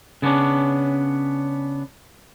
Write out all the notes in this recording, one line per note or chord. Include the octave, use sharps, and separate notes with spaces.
C#3 B3 C#4 D4